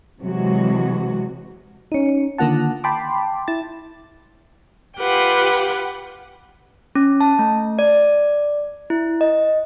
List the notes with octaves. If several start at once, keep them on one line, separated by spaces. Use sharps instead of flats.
C3 E3 F#3 G#3 F#4
C#4 D#4
D3 D#3 A#3 F4 F#5 A5
G5 A5 B5 C6 D6
E4 A6
F4 G4 B4 F#5 G5
C#4
A5
A3
D5
E4
D#5